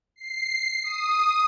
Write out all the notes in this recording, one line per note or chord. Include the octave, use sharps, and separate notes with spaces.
C7
D#6